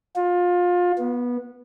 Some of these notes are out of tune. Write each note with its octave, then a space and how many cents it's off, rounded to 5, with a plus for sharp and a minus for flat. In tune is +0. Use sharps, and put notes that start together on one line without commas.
F4 +25
B3 -15